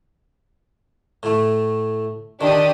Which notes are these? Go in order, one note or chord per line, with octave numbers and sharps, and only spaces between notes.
A2 A3
D#3 D4 G4 D#6